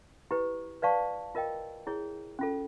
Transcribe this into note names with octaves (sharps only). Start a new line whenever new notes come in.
E4 G4 B4
B4 D5 F5 A5 C#6
F4 A#4 D#5 G5
E4 G#4 C#5
C#4 F4 A4